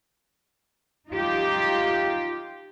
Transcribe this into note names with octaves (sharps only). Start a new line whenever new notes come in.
D#4 F4 G4